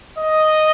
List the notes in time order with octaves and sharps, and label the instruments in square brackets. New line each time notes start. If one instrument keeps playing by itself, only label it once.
[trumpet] D#5